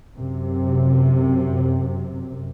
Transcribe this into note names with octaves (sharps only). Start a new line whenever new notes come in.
F#2 C3